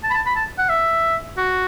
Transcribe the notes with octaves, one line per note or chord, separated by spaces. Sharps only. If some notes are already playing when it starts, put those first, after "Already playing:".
A5
B5
A5
B5
A5
F#5
E5
F#4